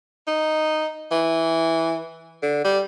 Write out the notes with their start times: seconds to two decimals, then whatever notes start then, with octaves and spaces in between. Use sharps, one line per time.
0.27 D#4
1.11 E3
2.43 D3
2.65 G3